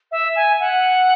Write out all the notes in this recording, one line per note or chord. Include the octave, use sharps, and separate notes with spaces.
E5
G#5
F#5